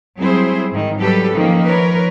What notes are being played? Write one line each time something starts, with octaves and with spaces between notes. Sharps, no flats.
F#3 G3 C4 E4 G#4 C5
G#2 D#3
F#3 G3 G4 A4 B4
D#3 F3 A#3 C#4
F3 A#4 B4 C#5